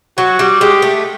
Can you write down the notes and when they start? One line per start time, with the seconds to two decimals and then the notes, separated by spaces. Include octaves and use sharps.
0.18 F#3 F#4
0.39 G3
0.61 G#3 G4
0.82 A3